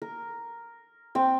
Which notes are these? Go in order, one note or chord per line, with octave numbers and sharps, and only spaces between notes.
A#4
C4 G5